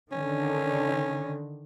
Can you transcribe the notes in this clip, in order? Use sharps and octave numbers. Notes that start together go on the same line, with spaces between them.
D3 D#3 C#4